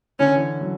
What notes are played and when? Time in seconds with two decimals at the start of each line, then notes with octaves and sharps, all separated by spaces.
0.19 D3 C#4
0.36 E3
0.61 F#3